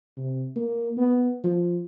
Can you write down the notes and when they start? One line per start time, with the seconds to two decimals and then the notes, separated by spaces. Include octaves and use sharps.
0.17 C3
0.56 A#3
0.97 B3
1.44 F3